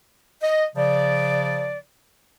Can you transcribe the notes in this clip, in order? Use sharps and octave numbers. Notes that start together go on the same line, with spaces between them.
D#5
C#3 F3 D5